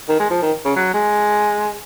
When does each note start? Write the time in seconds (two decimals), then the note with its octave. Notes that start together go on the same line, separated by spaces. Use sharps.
0.09 D#3
0.20 G#3
0.30 F3
0.42 D#3
0.65 C#3
0.76 F#3
0.94 G#3